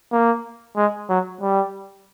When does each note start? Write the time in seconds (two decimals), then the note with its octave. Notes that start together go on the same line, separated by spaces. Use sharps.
0.12 A#3
0.76 G#3
1.09 F#3
1.41 G3